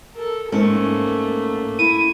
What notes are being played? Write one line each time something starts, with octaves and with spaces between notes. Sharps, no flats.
A4 A#4
G#2 A3 A#3 C#4
E4 D#7